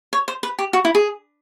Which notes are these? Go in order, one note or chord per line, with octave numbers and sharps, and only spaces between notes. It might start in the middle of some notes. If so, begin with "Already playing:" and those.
C#5
C5
B4
G4
F#4
E4
G#4